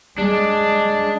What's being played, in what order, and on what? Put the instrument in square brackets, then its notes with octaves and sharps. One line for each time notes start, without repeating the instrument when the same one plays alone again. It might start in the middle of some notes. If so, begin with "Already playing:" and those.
[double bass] G#3 [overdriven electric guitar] D4